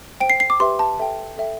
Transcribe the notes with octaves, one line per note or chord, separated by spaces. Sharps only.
C5 G5 D7
C7
C7
D6
G4 B4 E5 G5 C6
A5
A4 E5 G5
A4 E5 G5